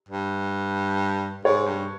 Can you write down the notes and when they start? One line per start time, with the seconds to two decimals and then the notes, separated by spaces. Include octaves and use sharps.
0.09 G2
1.44 G#2 C#5
1.67 G2